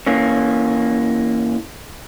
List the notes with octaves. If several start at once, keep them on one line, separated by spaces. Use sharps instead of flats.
E3 A#3 C#4